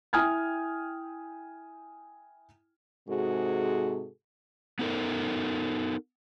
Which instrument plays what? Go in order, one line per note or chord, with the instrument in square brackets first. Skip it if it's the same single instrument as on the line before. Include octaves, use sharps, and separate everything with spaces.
[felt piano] E4 G5 G#5 D#6 F6 G#6
[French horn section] G#2 C3 F#4 G#4 A4
[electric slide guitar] B3 D#4 A4 A#4